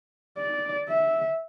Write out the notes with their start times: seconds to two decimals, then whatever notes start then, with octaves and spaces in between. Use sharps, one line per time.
0.38 D5
0.89 E5